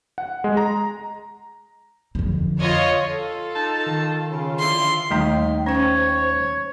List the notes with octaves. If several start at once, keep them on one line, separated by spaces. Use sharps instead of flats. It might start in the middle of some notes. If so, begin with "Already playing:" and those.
F#5
G#3
A#5
F2 D3
F4 C#5 D#5
F4 A4
D#4 A5
D#3
C#3 F4
D3 F3 E4 C6
D#2 G3 A3 D#4 D#5 G5 A#5
C#4 C5 C#5 G5